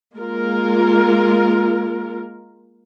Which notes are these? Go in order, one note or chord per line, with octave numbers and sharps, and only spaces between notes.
G#3 A#3 F4 A#4